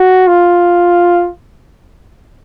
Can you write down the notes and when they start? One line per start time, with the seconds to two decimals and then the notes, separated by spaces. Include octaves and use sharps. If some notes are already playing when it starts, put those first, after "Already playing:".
Already playing: F#4
0.27 F4